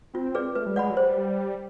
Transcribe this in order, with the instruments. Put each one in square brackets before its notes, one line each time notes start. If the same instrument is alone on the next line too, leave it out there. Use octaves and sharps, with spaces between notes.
[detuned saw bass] C4 [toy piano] F4
[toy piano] G#4 B4 D5
[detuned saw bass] A3 [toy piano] B4
[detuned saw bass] G3
[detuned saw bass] G#3 [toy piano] D5 F#5 B5
[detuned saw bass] F#3
[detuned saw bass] G3 [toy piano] C5